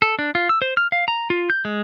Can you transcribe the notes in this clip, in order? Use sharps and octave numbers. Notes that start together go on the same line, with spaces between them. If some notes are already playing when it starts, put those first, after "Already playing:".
A4
D4
F4
E6
C5
F6
F5
A#5
F4
G6
G#3